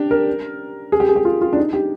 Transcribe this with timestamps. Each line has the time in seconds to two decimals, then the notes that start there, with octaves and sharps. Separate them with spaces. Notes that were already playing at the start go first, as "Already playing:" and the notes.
Already playing: D4 G4
0.11 A#4
0.92 G#4
1.00 G4
1.09 G#4
1.16 G4
1.25 F4
1.41 F4
1.53 D4
1.57 D#4
1.73 G4